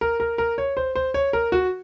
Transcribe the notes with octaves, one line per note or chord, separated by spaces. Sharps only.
A#4
A#4
A#4
C#5
C5
C5
C#5
A#4
F#4